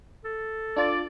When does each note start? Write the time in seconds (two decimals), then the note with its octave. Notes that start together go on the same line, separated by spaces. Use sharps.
0.25 A4
0.76 D4 F4 D5